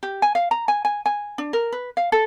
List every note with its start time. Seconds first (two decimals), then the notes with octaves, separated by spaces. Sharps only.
0.03 G4
0.22 G#5
0.35 F5
0.51 A#5
0.68 G#5
0.85 G#5
1.06 G#5
1.38 D4
1.53 A#4
1.72 B4
1.97 F5
2.12 A4